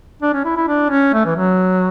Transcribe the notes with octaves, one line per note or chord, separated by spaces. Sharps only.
D4
C#4
E4
E4
D4
C#4
A3
E3
F#3